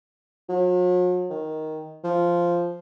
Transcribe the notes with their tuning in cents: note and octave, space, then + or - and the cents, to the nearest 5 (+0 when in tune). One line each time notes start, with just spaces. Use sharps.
F#3 -45
D#3 +5
F3 -5